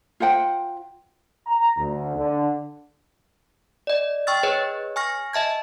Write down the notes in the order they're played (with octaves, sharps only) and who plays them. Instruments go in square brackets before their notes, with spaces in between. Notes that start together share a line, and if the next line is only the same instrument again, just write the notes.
[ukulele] F4 C5 F#5 G5
[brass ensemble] A#5
D2
D3
[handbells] D5 D#5
G5 C#6 E6 F6 A6
G#4 B4 C#5 D#5
G#5 C#6 F6 A#6
D#5 E5 A5 G#6